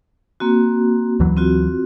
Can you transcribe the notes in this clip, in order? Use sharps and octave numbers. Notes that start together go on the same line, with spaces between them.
A#3 C4 F#4
D2 E3 F#3
C4 F4 F#4